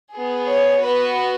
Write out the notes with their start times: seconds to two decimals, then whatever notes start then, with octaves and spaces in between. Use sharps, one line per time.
0.12 B3 G#4
0.48 C#5
0.83 B3 F#4 B4